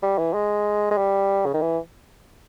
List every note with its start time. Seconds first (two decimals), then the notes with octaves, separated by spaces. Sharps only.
0.03 G3
0.18 E3
0.34 G#3
0.91 G#3
0.98 G3
1.46 C#3
1.54 D#3
1.62 E3